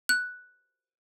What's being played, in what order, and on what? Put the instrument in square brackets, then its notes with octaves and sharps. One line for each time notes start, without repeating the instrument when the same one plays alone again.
[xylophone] F#6